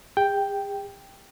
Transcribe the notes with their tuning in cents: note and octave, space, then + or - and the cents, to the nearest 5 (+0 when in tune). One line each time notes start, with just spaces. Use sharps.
G#4 -45 G5 +0